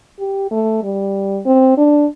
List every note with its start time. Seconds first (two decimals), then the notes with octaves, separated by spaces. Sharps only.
0.19 G4
0.51 A3
0.83 G3
1.46 C4
1.78 D4